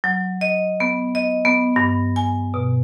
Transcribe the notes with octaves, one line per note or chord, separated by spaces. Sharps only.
F#3
D#5
B3
D#5
B3
G2
G#5
B2